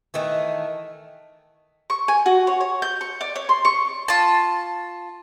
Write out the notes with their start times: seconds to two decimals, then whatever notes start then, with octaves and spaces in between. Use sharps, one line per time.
0.14 D#3 E3 A3
1.90 C#6
2.08 G#5
2.26 F#4
2.47 C#5
2.61 C#5
2.82 G6
3.01 C#6
3.21 D5
3.36 C#5
3.49 C6
3.65 C#6
4.08 F4 A5